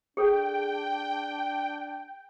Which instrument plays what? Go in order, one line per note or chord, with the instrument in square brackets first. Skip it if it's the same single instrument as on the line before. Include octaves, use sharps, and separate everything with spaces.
[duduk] D4 [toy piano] G#4 A4 [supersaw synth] G5